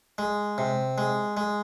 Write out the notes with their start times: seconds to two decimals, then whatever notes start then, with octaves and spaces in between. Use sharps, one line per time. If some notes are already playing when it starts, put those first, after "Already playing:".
0.18 G#3
0.58 C3
0.98 G#3
1.37 G#3